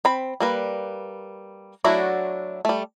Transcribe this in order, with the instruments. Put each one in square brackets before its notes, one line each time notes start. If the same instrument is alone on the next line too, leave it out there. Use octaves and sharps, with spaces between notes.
[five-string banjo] C4 B5
G3 A#3 B4
F#3 A3 D4 E4 F#4
G3 A3